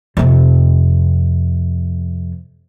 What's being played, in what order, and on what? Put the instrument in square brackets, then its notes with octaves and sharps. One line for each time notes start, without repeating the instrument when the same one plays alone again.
[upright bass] F2 C3